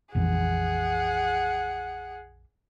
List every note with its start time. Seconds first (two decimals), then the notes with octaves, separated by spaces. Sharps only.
0.15 A#1 F2 E3 G#4 F#5